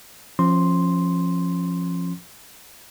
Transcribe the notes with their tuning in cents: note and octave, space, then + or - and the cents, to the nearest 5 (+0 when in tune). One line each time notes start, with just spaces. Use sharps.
F3 +0 C#4 -25 C6 +0